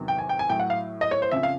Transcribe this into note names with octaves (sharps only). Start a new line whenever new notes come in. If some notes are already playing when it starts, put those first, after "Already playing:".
Already playing: E2 C3 D#3 F#3
G5
G#5
G5
G#5
A2 F#3 G5
F#5
F5
D#5
C#5
C5
F2 C#3 F3 E5
F5